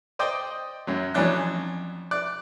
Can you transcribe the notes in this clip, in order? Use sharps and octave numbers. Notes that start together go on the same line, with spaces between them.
C5 D5 D#5 G5
F#2 F#3
F2 E3 F#3 C#4 D4 F#6
D5 F#6